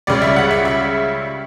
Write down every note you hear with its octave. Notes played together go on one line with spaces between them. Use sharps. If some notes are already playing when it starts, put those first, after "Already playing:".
C#2 C#3 G3 D5
E5
F#5
E5
E5